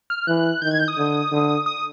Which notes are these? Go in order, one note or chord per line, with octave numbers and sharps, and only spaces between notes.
F6
E3 F#6
D#3 G6
G#6
G6
D#6
D3
D3
D#6